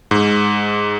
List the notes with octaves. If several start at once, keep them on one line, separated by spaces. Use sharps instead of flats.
G#2